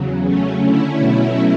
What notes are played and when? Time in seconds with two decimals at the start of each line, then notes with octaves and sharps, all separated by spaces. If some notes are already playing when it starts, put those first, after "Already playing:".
Already playing: E2 C#3 F#3
0.25 C#3 F#3 A3 C#4
0.62 D3 A3 C#4 E4
0.98 B2 F#3 A3 C#4 E4